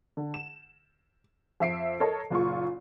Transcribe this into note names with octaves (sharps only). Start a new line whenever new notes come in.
D3
E7
F2 E5 C7 D7
A4 A#4 C#5 D#5 A5
F#1 A#2 F4 C#6